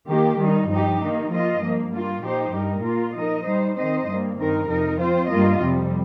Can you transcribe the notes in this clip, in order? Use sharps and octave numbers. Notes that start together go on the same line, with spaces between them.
D#3 A#3 G4
D#3 G3 D#4
G2 F3 D#4 G4
D#3 A#3 D#4
F3 A#3 F4 D#5
G2 F3 A#3
G2 G3 A#3 F4
A#2 F3 D#4 G4 C5
G2 G3 D#4 A#4
A#2 A#3 F4 A#4
F3 D#4 A#4 D#5
G3 D#4 C5
D#3 C4 D#4 C5 D#5
G2 G3 A#3
G2 D#3 C4 D#4 A#4
F2 C3 F3 D#4 A#4
F3 C4 F4 C5
G2 G3 A#3 F4 D#5
F2 C3 G3